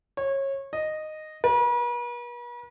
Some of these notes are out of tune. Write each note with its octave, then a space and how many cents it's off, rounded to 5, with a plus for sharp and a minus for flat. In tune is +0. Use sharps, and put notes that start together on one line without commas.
C#5 -25
D#5 -10
B4 -45